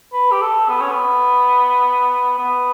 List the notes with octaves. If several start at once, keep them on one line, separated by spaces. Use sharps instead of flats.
B4
G4
A4
B3
C#4
B3
B3